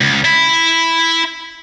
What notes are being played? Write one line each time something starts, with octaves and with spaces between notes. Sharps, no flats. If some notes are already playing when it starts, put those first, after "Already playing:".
C#2
E4